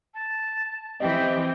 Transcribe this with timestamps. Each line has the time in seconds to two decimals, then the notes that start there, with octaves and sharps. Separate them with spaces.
0.14 A5
1.00 E3 C4 G4 D#5